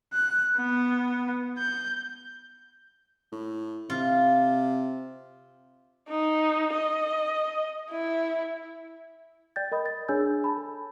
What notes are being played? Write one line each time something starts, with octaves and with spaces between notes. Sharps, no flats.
F#6
B3
G6
A2
C3 F4
D#4
D#5
E4
D5 G5 G6 A6
A#4 D#5 B5 D#6
A6
D4 G#4 C#5 G#5 E6 G6
A5 B5
A4